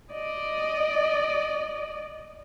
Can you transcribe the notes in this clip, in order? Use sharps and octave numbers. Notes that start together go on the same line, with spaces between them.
D5 D#5